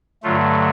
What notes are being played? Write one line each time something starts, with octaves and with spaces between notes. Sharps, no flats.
G2 D3 F#3 A3 F4